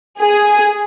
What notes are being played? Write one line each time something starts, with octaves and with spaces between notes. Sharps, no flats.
G#4